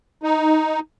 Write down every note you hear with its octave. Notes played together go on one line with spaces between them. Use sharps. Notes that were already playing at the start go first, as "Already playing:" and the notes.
D#4